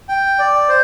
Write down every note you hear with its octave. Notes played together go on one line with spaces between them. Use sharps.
G5
D5
C5